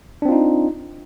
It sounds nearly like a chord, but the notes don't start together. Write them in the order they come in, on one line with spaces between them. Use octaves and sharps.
D4 C4 F4 D#4